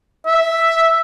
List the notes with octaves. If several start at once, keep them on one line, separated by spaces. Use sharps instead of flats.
E5